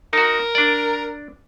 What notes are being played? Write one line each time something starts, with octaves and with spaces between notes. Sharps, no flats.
D#4 F#4 A#4
D4 D5